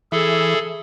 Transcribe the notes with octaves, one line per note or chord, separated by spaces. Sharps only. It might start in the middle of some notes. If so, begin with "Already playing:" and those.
E3 G#4 A4